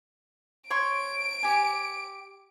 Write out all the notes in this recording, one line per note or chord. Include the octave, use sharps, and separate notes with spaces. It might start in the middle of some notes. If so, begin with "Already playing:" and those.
C#5 C6 C#6 D7
G4 G#5